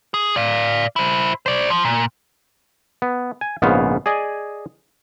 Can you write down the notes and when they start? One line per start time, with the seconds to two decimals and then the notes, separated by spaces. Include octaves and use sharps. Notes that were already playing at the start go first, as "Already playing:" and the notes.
0.14 G#4
0.36 D5 F5
0.96 E4 C5
1.46 C5 D5
1.70 F3
1.85 A#2
3.02 B3
3.41 G#5
3.62 A#1 G#2 C#3 B3 C5 F5
4.06 G#4 D5 D#5 G#5